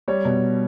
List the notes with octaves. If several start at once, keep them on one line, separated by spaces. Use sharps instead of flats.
G3 C#5
B2